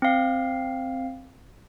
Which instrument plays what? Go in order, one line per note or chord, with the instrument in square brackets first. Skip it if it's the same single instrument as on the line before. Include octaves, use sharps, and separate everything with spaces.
[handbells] C4 F5